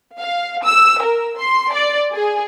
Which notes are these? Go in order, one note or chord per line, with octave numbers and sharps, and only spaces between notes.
F5
E6
A#4
C6
D5
G#4